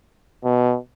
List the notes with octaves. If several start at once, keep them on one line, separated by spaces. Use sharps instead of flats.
B2